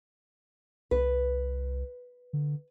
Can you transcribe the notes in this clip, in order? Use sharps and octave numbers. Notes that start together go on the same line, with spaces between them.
C2 B4
D3